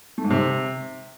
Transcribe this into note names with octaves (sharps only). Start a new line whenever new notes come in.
A3
G#2
C3